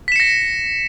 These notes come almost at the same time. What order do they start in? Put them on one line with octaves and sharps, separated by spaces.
B6 E7 C#7 A#6